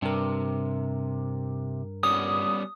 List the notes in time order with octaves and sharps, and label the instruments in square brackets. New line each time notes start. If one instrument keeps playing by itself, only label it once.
[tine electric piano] G2 A#4 [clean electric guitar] C3
[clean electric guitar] G3 B3 C#4 [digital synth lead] D#6